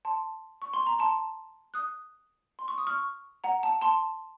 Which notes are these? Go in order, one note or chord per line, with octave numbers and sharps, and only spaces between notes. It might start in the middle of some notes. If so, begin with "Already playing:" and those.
A5 C6
C#6
C6
A#5
A5 C6
D#6 F#6
C6
C#6
D#6
C#6 F6
F#5 A#5
A5
A5 C6